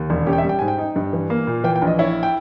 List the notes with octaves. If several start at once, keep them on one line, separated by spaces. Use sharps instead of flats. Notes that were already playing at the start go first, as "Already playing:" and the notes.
Already playing: D#2
E1
C#4 G4
G5
E5
G3
G5
G#2 G#5
G5
D#4
G2
E3
A#3
A#2
E3 G5
G5
A#1
D#5
E4 C#5
G5